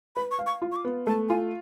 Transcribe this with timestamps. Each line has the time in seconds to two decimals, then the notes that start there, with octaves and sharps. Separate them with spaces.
0.16 B4 B5
0.31 C#6
0.39 F5
0.46 C#6
0.62 F4
0.72 C#6
0.76 D6
0.85 B3
1.07 A3 A5
1.29 F4 G#5